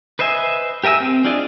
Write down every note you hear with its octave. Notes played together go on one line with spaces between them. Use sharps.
B4 C5 D#5 E5 G#5
G4 A#4 E5 G#5 E6
C4
D4 F4 G#4 D5 D#5